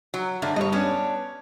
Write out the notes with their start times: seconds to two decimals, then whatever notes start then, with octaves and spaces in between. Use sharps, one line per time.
0.14 F#3
0.42 G2 D3 A3
0.56 G2 C#5 D#5
0.72 B3 C#4 D4 C#5